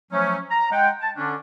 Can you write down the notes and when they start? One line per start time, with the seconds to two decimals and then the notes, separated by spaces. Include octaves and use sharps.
0.11 F3 F#3 A3 C#4
0.50 A#5
0.71 G#3 F#5 G5
1.00 A5
1.16 D3 C#4 D4